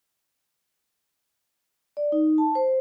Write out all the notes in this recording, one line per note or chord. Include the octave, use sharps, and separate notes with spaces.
D5
D#4
A5
C5